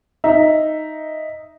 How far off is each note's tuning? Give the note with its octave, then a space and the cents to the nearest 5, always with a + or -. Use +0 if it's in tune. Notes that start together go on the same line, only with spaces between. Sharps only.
D#4 +0 E5 +0